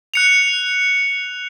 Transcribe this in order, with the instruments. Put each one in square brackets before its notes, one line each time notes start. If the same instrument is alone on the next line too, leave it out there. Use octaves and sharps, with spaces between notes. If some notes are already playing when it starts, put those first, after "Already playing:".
[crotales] F#6 C#7 F7